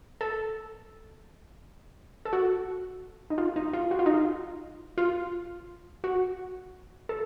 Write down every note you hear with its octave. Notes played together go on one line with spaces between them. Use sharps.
A4
A4
F#4
D#4
F4
D#4
F4
F#4
F4
D#4
F4
F4
F#4
A4